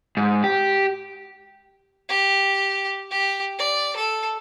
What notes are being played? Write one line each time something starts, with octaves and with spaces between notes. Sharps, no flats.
G#2
G4
G4
G4
D5
A4